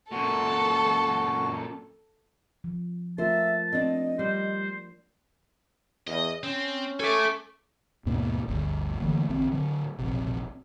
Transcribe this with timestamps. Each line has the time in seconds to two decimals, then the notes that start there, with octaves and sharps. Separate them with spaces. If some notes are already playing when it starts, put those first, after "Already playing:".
0.11 F#2 A#2 F#4 A4
2.64 F3
3.18 A3 F4 A#4 C5 E5 A5
3.73 C4 D4 D#5
4.19 G3 C5
6.07 E2 D#5
6.43 C4 C#4
7.00 A4 E5 G#5 C#6 D6
8.06 D#2 G#2 B2 A#3
8.48 G1 D2
9.00 D3 E3 A3 A#3
9.29 A1 D3 C4
9.52 A2 D3 F#3
9.99 E1 A#1 C3